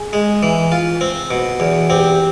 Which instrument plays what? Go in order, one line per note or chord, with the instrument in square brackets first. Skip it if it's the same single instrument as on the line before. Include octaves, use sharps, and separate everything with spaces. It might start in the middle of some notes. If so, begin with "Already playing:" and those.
Already playing: [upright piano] G#4
[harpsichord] G#3
E3
F4
C4
B2
E2
[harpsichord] C4 [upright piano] G4